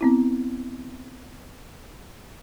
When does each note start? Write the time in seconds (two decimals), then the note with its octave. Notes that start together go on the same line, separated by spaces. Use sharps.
0.01 B3 C4 E4